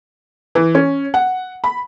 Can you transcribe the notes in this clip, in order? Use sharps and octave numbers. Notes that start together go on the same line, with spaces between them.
E3
C#4
F#5
B5